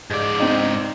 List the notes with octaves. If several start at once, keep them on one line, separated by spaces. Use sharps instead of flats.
G#2 G#3 D5
C4 D#4